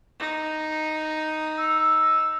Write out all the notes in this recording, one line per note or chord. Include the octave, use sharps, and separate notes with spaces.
D#4
E6